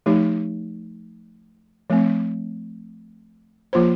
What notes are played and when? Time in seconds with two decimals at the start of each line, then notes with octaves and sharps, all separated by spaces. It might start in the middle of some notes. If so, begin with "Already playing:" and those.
0.06 F3 A3 D#4 G4
1.90 F3 A3 C4
3.73 F3 A#3 F4 C5